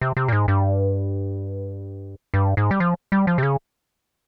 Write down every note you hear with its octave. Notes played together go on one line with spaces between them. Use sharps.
C3
C3
A#2
G#2
G2
G2
G#2
G3
F3
G3
F3
C3
C#3